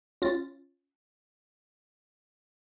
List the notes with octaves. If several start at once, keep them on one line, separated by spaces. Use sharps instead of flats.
C#4 F4 A6